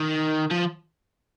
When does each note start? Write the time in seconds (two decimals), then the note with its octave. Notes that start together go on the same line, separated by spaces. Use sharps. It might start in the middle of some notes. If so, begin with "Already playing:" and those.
Already playing: D#3
0.51 F3